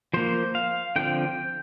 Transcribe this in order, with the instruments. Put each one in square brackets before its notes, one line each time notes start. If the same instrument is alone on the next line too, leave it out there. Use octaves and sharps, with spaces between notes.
[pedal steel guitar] F3 A#3 C5
F5
D3 F3 C4 G5